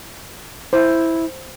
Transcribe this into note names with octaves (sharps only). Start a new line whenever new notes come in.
E4 C5